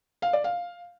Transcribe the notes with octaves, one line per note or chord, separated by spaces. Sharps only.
F5
D5
F5